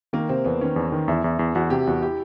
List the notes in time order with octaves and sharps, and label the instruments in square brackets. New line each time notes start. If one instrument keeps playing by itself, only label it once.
[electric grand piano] D#3 [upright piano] A#3
[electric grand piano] C3 [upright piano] C4
[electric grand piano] E2 [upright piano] B3
[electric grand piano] D#3 [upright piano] C#4
[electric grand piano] E2
D#3
[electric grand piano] E2 [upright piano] E4
[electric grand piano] E2
E2
[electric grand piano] E2 [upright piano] F#4
[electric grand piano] C3 [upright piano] G4
[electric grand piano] E2 [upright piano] F#4
[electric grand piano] E4 [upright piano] G4